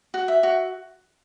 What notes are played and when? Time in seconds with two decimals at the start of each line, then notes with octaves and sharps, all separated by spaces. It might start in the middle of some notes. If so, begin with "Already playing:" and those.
0.14 F#4
0.28 E5
0.43 F#4